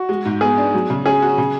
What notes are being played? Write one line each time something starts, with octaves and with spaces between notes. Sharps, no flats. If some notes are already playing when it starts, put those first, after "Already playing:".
Already playing: F#4
G#3
G#2
B3 G#4
D4
F#3
C#3
C#4 G#4
F#4
C#3